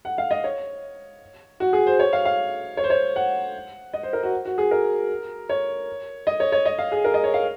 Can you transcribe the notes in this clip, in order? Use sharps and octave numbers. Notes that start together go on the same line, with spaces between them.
F#5
F5
D#5
C#5
F#4
G#4
C5
C#5
F5
F5
C#5
C5
C#5
F#5
D#5
C5
A#4
F#4
F#4
G#4
A#4
C#5
D#5
C#5
C#5
D#5
F5
G#4
A#4
D#5
C#5
F5